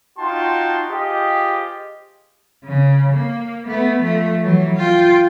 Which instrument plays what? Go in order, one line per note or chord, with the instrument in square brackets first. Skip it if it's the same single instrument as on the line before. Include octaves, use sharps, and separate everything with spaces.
[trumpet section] D#4 F4 F#4 G5 A5 C6
F4 G4 G#4 C5 D#5
[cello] C#3
A#3
A3 B3
F3 A3
E3 F#3
F4 G5